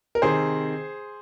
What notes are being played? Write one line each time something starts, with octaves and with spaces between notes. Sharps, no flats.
A#4
C3 D#3 C4 G#4 C5